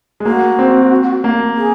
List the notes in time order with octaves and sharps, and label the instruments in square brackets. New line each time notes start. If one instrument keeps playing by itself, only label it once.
[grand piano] G#3
[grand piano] A#3 [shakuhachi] F#4
[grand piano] C4
A#3
[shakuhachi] G#4